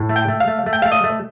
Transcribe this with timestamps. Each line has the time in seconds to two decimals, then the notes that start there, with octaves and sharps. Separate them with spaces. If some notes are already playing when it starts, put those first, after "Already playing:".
Already playing: A2
0.09 A3
0.16 G5
0.28 A3
0.40 F5
0.47 A3
0.66 A3
0.73 G5
0.82 A3 F5
0.92 D#5
1.04 A3